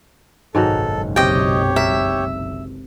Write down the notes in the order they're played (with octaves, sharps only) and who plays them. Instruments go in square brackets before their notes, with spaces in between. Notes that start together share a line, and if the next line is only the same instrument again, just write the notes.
[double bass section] F#1 B1 [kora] G#2 D#3 F#3 [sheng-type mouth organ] A4
[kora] C3 [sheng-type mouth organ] G4 C#5 [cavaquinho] D#5 G5
[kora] A#4 [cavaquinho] E5